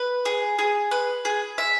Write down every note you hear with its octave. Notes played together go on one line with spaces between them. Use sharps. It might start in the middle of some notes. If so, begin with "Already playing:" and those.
Already playing: B4
G#4
G#4
B4
G#4
E5